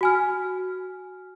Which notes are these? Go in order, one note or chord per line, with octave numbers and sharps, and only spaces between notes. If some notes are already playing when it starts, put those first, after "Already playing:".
F#4 G#5 F6